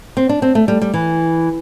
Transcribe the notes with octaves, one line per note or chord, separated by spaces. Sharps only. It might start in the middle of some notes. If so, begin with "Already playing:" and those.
C4
D4
C4
A3
G3
G3
E3